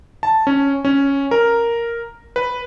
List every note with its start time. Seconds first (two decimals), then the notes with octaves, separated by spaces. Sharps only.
0.23 A5
0.47 C#4
0.85 C#4
1.31 A#4
2.36 B4